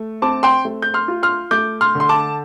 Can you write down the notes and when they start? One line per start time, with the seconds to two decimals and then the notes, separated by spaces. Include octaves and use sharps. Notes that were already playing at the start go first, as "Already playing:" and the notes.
Already playing: A3
0.22 C4 A5 D6
0.43 G5 C6
0.65 A3
0.82 G6
0.94 C6 F6
1.08 F4
1.23 C6 F6
1.51 A3 D6 G6
1.81 C6 F6
1.95 D3 C6
2.09 A5 D6